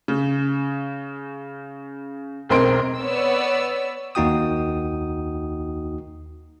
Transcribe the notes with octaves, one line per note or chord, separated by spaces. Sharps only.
C#3
E1 B1 C4 A#4 C6 D7
B3 C#5 D5 E6
D#2 A#3 D#4 F#4 G5 D#6